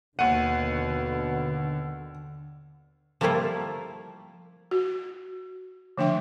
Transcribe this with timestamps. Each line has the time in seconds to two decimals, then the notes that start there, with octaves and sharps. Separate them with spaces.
0.19 D#2 B2 D3 F#5 D#7
3.21 F3 G3 A3 A#3 E4 F4
4.71 F#4
5.98 D3 F3 A3 D4 E5 G5